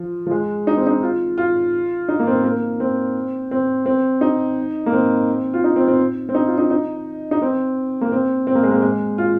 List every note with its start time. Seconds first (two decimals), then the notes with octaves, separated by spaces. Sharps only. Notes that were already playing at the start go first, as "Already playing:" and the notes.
Already playing: F3
0.27 F3
0.31 G#3
0.67 D#4
0.77 C4
0.87 D#4
1.03 F4
1.38 F4
2.09 D#4
2.20 A#3
2.27 C4
2.44 A#3
2.80 C4
3.51 C4
3.86 C4
4.21 D#4
4.86 A#3
4.93 C4
5.54 F4
5.64 D#4
5.76 C4
5.88 C4
6.29 C4
6.35 D#4
6.47 F4
6.58 D#4
6.70 D#4
7.31 D#4
7.42 C4
8.01 A#3
8.12 C4
8.47 C4
8.55 A#3
8.63 G#3
8.71 A#3
8.82 G#3
9.18 F4